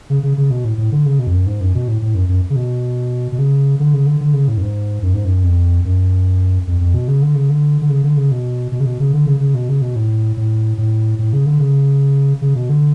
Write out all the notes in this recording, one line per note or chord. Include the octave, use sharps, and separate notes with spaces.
C#3
C#3
C#3
B2
A2
A2
D3
C#3
B2
F2
F#2
G#2
F#2
B2
A2
A2
F#2
F#2
C#3
B2
B2
C#3
D3
C#3
D3
D3
C#3
A2
F#2
G#2
F#2
G#2
F#2
F2
F#2
F2
F2
B2
C#3
D3
C#3
D3
D3
C#3
D3
C#3
B2
B2
C#3
B2
C#3
D3
C#3
C#3
B2
C#3
B2
A2
A2
A2
A2
C#3
D3
C#3
C#3
B2
D3